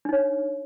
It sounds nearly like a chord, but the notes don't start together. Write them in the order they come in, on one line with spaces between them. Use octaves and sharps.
D4 D#4 C#5